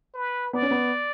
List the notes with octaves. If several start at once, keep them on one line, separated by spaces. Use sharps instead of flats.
B4
B3 D5
C#4
B3